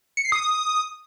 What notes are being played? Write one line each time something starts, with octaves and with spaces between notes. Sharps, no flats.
C#7
C7
D#6